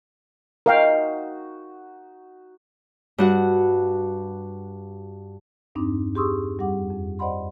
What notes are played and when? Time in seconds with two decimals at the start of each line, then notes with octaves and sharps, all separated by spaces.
0.66 D#4 F#4 A#4 F5 G5
3.18 G2 F#4 F#5
5.75 E2 G2 C4 D4 D#4 D6
6.15 G4 G#4 C6 C#6 D#6 E6
6.58 F2 G3 G4 F#5 D6
6.90 F2
7.19 C5 D5 D#5 F#5 B5 C6